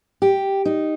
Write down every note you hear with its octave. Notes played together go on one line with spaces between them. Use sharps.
G4
D#4